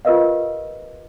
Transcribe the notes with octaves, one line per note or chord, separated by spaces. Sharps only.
F4 G4 A#4 B4 D#5 F5